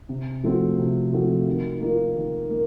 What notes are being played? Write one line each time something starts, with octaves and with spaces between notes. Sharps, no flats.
C3
F3 A3 C4 F#4
C3
F3 A3 C4 F#4
D#3
A#3 F4
D#3
A#3